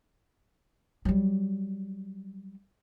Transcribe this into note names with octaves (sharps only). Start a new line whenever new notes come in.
F#3 G3